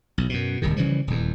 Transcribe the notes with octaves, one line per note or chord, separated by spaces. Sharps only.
B1
F#2 B2
D1 C2 C3 D#3
C#3 E3 F3 G3
D#1 E2